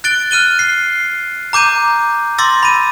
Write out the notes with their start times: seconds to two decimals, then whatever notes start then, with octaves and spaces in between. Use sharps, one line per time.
0.04 F#6 A6 D7 G7
0.31 F6 F#6 D#7 G7
0.59 C7
1.53 A#5 D6 G6 D#7
2.38 C6 D6 E6 A6 A#6
2.63 B5 D#7